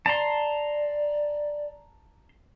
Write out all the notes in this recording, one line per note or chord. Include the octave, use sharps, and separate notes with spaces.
D5 A5 A#5 C6